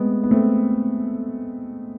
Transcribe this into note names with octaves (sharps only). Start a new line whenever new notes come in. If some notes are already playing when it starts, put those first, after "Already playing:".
Already playing: G#3 A3 B3 C4
B3
A3 C4